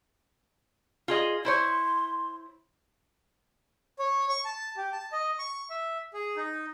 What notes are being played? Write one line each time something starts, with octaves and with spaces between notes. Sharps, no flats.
F4 G#4 D#5
E4 C5 C#5 C6
C#5
C#6
A5
G4
A5
D#5
C#6
E5
G#4
D#4